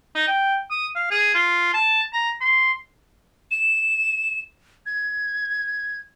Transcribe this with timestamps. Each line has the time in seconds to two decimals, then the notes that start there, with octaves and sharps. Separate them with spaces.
0.15 D#4
0.27 G5
0.70 D#6
0.95 F5
1.11 G#4
1.34 F4
1.74 A5
2.12 A#5
2.41 C6
3.51 E7
4.86 G#6